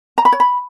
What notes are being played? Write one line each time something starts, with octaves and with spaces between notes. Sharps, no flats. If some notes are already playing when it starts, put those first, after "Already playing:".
A#5
B5
C#5
B5